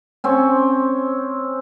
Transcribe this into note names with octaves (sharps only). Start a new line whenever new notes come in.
C4 C#4